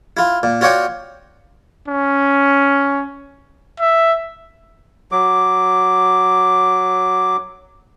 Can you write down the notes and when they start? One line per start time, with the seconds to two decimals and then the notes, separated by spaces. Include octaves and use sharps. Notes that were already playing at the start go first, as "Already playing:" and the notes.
0.17 E4 F4
0.43 A#2
0.61 F4 F#4 C#5 D5 F#5 G5
1.88 C#4
3.80 E5
5.12 F#3 D6